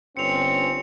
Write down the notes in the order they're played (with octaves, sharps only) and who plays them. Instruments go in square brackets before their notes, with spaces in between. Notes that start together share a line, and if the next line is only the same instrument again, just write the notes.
[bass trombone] G1 [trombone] C4 [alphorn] C#4 [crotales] C#7 F7